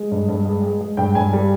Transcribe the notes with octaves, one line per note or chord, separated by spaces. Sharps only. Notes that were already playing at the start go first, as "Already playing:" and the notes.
Already playing: G#3 D#5
G2
G2
G#3
G#3
G#3
G2 G5
G2 G#5
G3